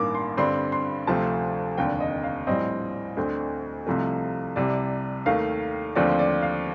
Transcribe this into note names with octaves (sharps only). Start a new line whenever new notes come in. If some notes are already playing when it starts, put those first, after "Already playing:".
Already playing: A1 G2 D#3 A#3 D6
C6
G2 D3 G3 C4 C6
C6
D2 C3 F3 A3 C4 A5
F1 D#2 D3 G5
D#5
F5
A#1 A2 G3 C4 D#5
D2 D3 A3 C4
C2 C3 F3 A3
C2 C3 G3 D5
D#2 D#3 A3 F5
D#2 D3 F3 A3 C4 D5
D5
F5